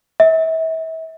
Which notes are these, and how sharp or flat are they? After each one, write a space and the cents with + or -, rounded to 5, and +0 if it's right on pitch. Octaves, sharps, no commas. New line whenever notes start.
E5 -35